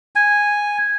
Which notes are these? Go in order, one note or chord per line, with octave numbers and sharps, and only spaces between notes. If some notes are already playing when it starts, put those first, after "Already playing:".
G#5